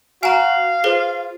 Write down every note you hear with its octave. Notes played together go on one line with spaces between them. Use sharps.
F#4 F5 G#5 A#5
F4 G#4 B4 C5